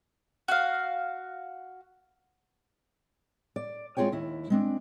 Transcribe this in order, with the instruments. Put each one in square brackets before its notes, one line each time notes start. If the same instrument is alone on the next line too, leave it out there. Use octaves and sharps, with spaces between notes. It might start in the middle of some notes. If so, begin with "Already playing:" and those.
[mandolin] F#4 F5
[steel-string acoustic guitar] D5
G#3 C4 F4 G#4 C#5 G5
D#2 E4
G#3 C4 D4